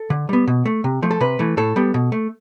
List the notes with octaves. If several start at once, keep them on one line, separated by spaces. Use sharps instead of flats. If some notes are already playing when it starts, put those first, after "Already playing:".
Already playing: A4
D3
G3 B3
B2
A3
C3
F3 A3
A4
C3 B4
E3 A3
A2 A4
G3 B3
B2
A3